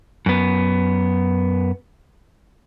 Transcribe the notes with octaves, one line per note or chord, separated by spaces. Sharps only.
F#2 B3